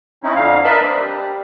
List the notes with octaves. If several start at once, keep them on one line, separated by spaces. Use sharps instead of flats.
C4 C#4 D#4 E4
F2 D3 F5
A#4 B4 D#5 E5 A5 B5
C4 D4
G3